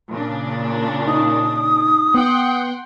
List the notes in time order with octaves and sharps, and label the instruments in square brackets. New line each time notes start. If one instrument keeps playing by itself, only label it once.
[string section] A#2 C#3 D4
[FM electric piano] D#4 [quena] D#6
[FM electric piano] B3 [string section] F#5 G5 C6